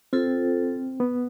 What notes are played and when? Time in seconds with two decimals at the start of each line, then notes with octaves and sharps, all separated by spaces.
0.13 C4 F4 A4 C5
1.00 B3